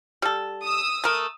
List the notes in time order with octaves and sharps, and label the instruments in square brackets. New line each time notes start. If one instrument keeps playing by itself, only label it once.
[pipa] G3 A4
[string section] D#6 E6
[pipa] A3 A#4